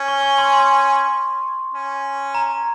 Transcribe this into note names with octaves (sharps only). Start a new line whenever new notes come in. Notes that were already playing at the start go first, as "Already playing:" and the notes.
Already playing: C#4
C#6
C#6
C6
C#6
C6
C#4
A#5